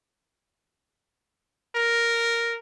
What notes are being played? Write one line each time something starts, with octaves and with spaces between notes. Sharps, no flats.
A#4